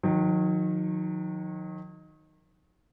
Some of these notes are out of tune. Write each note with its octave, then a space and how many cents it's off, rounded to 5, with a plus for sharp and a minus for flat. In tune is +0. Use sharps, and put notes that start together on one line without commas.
D#3 +0 F#3 -40